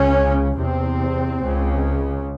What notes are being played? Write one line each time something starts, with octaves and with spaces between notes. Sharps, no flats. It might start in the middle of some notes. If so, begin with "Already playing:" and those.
Already playing: C#2 C#3 C#4
E2 C3 C4
C#2 C#3